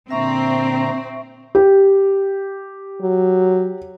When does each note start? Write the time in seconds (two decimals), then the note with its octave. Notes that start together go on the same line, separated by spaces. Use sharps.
0.11 A#2 D3 C4 E5 A#5 C#6
1.55 G4
3.02 F#3